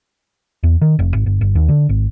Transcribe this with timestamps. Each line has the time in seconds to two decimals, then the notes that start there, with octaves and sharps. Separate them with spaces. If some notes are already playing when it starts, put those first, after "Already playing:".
0.63 E2
0.82 D#3
0.99 F1
1.14 G#1
1.26 G1
1.41 G1
1.55 D#2
1.69 D3
1.89 G#1